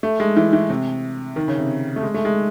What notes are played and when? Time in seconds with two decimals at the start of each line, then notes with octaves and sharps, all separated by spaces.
0.03 A3
0.20 G#3
0.37 E3
0.53 E3
0.70 C3
1.36 D#3
1.48 C#3
1.58 C3
1.96 A3
2.03 G#3
2.14 A3
2.25 G#3